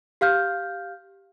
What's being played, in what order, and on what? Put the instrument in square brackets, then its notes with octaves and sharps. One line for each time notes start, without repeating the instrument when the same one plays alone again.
[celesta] G4 F5 F6 G6